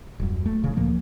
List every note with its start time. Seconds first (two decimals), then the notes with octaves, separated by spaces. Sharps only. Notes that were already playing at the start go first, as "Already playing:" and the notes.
0.20 D#1 F#2
0.46 A3
0.64 D#1 A#1 E2 C#3
0.77 D2 A#2 F3 A#3